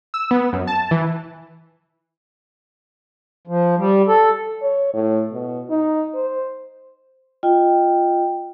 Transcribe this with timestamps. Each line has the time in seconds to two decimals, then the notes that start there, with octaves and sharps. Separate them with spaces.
0.14 E6
0.31 B3
0.53 F#2
0.67 A5
0.91 E3
3.47 F3
3.78 G3
4.08 A4
4.62 C#5
4.94 A2
5.33 B2
5.70 D#4
6.15 C5
7.43 F4 D#5 G5